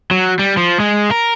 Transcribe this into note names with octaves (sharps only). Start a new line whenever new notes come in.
F#3
G3
F3
G#3
A#4